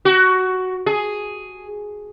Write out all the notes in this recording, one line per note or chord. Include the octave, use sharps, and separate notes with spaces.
F#4
G#4